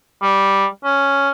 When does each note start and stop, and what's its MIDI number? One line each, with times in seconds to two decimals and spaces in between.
0.22 0.65 55
0.84 1.30 61